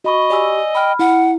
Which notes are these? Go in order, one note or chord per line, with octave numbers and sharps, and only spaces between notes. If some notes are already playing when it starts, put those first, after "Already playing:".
F#4 D#5 B5 C#6
G4 D5 G#5 E6
G5 B5 F6
E4 F#5